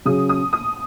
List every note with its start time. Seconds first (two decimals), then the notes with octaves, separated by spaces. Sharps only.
0.06 C#3 F#3 C#4 D#6
0.29 D#6
0.53 D#6